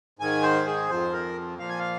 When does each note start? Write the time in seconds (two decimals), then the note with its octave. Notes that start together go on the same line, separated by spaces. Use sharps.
0.19 G#2 D#3 G#5
0.43 C5
0.66 G#4
0.89 F2 F3 C5
1.13 A#4
1.58 A#2 F3 F5
1.69 G#5
1.79 F5